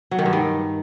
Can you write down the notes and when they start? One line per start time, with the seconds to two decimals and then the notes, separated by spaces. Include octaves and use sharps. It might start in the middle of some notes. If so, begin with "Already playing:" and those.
0.11 F#3
0.19 D#3
0.26 G2
0.33 D#3